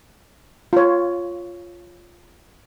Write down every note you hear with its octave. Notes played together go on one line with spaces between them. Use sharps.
F4 C#5